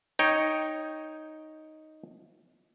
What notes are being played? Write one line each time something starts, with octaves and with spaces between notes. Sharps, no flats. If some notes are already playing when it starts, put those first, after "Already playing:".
D#4 C#5 G5